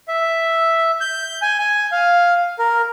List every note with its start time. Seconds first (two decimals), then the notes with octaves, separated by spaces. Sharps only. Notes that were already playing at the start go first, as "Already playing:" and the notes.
0.08 E5
1.01 G6
1.42 G#5
1.59 G#5
1.92 F5
2.59 A#4